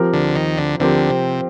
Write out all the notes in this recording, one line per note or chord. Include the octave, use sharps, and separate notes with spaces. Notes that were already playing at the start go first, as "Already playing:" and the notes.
Already playing: F3 C4 G4 A#4
D2 D3
D#2 D#3
D2 D3
D2 D3 F3 C4 G4 A#4
C3